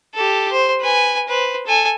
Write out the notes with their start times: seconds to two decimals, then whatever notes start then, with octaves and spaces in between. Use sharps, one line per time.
0.14 G4 A4
0.52 C5
0.81 B4 G#5
1.28 B4 C5
1.67 A4 G#5